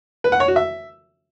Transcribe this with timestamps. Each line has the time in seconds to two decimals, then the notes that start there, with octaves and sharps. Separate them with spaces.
0.24 B4
0.32 F#5
0.40 C#5
0.48 F#4
0.56 E5